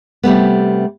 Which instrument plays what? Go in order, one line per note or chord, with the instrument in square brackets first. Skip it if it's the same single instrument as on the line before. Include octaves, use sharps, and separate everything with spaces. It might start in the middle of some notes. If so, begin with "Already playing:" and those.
[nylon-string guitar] C3 G3 A3 B3